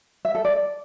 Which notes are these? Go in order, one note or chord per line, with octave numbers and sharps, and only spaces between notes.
E5
A4
D5